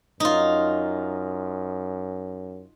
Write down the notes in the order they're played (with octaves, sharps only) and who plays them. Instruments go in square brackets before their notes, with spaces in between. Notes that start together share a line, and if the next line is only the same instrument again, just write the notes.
[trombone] F#2 [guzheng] D#4 F4